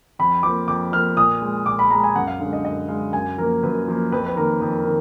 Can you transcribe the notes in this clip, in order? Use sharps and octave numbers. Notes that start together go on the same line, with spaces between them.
F2 B5
F3 A#3 D6
F2 D6
F3 A#3 F6
A#2 D#6
G#3
A#2 D6
B5
G#3 A#5
G#5
F#2 F#5
F5
D3 G#3 F5
D#5
F#2 D#5
D3 G#3 F5
F#2 G#5
F3 A#3 A#4
F#2 B4
F3 A#3
F2 B4
B4
D#3 A#3 A#4
F2
D#3